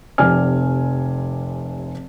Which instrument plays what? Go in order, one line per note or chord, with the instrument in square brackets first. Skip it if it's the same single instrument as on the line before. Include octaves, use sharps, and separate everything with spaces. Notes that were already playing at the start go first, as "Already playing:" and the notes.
[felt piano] F1 C3 D5 G#5 F6